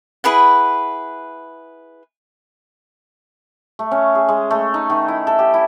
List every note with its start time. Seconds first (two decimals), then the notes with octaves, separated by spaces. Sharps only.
0.24 E4 G#4 B4 F#5
3.79 A3
3.91 C#4
4.15 G#4
4.29 G#3
4.51 A3
4.74 D#4
4.90 D#3
5.08 E4
5.27 A4
5.39 G4
5.54 E4